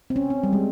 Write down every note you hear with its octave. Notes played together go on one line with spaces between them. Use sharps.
C4
C#4
C4
G3
G#3